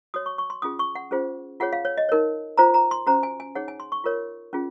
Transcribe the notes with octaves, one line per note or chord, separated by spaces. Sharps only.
F#4 C#5 D#6
C#6
C#6
C6
C#4 F4 G#4 D#6
C#6
F#5
C#4 F4 G#4 C5
F4 G#4 C#5 F#5
F5
C#5
D#5
D#4 A#4 C#5
F4 C5 A#5
A#5
C6
C#4 F#4 C5 A#5
G#5
G#5
D#4 G#4 C#5 F#5
G#5
C6
C#6
F4 A#4 C#5
C#4 F4 G#4